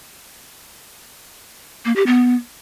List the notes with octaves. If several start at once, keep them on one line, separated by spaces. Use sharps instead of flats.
A#3
G4
B3